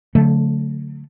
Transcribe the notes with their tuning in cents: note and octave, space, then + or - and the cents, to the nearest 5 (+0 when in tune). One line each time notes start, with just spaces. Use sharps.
D3 -40 F#3 -35 A3 +0